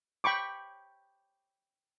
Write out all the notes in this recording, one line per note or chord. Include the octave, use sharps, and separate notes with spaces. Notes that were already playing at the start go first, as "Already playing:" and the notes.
G5 B5 C#6 D6